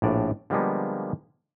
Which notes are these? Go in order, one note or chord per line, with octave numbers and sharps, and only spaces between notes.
A#1 A2 D5
D3 F3 G3 G#3 A#3 B3